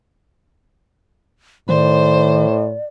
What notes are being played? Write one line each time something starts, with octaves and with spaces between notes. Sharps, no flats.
A2 D#3 C5 D5